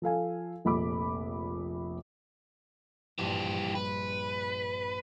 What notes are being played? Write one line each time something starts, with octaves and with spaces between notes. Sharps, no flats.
F3 A4 F5 G#5
F1 A#1 B5 D6
A#1 G2 E3 G4
B4